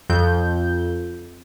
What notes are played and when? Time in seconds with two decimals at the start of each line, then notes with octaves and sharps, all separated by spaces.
0.09 F2 G6